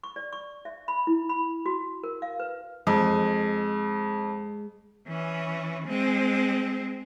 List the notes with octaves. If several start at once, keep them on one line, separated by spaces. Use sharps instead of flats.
C#6
D5
C#6
E5
B5
E4
B5
F#4
A#4
F5
B4
F2 G#3
E3 C#4
G#3 C4